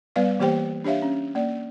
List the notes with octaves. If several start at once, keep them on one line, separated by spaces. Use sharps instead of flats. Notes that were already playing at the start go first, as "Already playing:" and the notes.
G3 B3 B4 D5 F5
E3 A#3 G4 C5 G5
D4 G4 C#5 E5 F5
C#4
A#3 D5